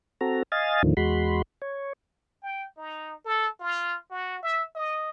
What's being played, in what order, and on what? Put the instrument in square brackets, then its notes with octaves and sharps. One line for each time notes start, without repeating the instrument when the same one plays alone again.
[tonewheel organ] C4 F#4 A4 A#5
D#5 F5 G#5 A6
D#2 A2 D3 D#3 F3
E2 G#3 F#4 B5 C6
C#5
[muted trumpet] G5
D#4
A4
F4
F#4
E5
D#5